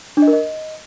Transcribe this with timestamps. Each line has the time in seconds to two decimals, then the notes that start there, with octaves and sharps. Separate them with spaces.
0.17 D4
0.22 D#5
0.28 A#4
0.33 D#5